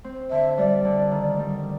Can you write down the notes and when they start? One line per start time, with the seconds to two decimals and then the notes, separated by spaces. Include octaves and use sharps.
0.04 C4
0.31 D3 E5
0.57 G3 D5
0.85 D3
1.11 D#3
1.39 G3